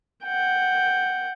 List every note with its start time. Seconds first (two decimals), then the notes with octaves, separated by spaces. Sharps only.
0.24 F#5 G5